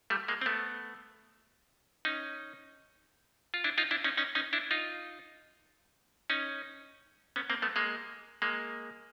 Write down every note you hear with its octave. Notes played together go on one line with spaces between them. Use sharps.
G3 A3
G#3 A#3
C4
A3 B3
C#4 D#4
F4
D4 E4
D#4 F4
D4 E4
C#4 D#4
C#4 D#4
C#4 D#4
D4 E4
D#4 F4
C#4 D#4
B3 C#4
A#3 C4
A3 B3
G#3 A#3
G#3 A#3